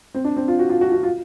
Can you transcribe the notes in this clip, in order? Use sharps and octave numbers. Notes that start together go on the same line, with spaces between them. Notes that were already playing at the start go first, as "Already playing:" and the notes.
C4
D4
C4
F4
F#4
F4
F#4
F#4
F4